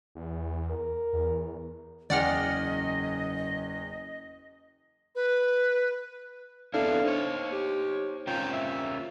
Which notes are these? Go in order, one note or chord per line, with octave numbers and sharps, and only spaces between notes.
E2
A#4
E2
F#1 E2 G#4 D5 D#5 F#5 G5 F6
B4
B3 C4 D4 E4 A4 F5
A#3 D#4 C5 C#5
G4
C#4 F4 A#4 G5
E5